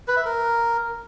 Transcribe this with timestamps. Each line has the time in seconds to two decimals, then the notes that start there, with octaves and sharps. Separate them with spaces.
0.08 B4
0.16 E5
0.25 A#4